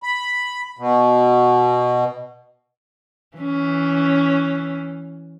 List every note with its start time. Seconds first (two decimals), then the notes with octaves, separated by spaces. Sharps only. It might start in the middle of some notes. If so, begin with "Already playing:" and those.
0.03 B5
0.79 B2
3.37 E3 C#4